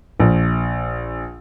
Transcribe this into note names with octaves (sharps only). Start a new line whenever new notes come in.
A#1